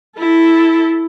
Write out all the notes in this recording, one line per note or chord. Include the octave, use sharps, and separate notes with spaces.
E4 A4